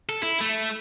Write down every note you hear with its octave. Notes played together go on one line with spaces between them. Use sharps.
A4
E4
A3